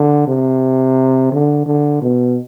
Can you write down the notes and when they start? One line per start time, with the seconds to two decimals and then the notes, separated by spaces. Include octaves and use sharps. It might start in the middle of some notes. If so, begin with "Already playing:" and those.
Already playing: D3
0.27 C3
1.32 D3
1.66 D3
2.02 B2